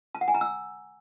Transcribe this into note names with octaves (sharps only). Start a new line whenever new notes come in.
A5
F#5
G#5
A#5
E6